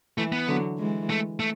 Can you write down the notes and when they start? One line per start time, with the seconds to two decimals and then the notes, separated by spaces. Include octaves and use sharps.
0.18 E3 A3
0.32 B3
0.48 D3 F#3
0.78 E3 G#3
1.10 A3
1.40 A3